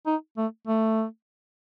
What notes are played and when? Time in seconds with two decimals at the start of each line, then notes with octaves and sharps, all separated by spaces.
0.06 D#4
0.37 A3
0.67 A3